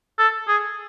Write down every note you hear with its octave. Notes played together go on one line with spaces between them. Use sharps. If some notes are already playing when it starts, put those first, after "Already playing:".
A4
G#4